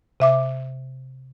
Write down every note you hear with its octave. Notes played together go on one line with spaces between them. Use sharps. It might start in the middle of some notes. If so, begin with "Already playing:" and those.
C3 E5 D6